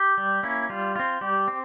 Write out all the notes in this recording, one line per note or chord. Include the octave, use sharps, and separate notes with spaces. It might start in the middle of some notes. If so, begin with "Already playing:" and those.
Already playing: G4
G3
A#3 C#4 E4
G3 F4
C4 F4
G3 G4
C4